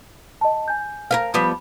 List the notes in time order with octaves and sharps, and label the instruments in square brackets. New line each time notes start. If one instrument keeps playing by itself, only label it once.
[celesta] D#5 A5
G#5 G6
[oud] A#4 B4 F5
F3 G3 B3